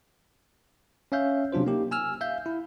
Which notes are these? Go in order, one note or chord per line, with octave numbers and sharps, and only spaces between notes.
C#4 C#5 E5 F5 G6
C3 F#3 D4 F4 C5
A#3 D#4 G4
G#5 E6 F6
E5 F5 G6
E4